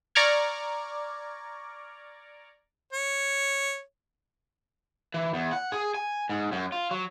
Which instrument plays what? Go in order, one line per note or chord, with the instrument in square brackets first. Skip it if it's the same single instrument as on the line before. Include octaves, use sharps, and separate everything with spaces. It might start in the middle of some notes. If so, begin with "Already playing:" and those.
[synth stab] D5 A#5 C#6 D6 F6 G#6
[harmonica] C#5
[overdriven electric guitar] E3
E2
F#5
G#4
G#5
G#2
F#2
F4
F#3